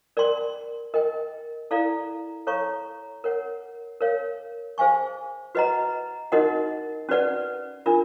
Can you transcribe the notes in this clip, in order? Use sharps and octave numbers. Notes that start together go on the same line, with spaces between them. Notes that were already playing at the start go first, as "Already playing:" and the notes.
A#4 D5 G5 C6
A#4 D#5 G5
E4 A4 D5 F5 A#5
A4 C#5 F5 A#5 C#6
A#4 C#5 F#5
A#4 C#5 F5
G#4 C5 F5 G#5 C#6
F#4 B4 D#5 F#5 A#5
D#4 F#4 A#4 D#5 F#5
C#4 F#4 B4 D5 F#5
D4 F4 A#4